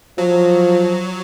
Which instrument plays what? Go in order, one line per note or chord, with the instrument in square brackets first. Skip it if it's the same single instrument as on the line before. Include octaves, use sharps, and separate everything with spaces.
[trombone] F3 [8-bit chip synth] F#3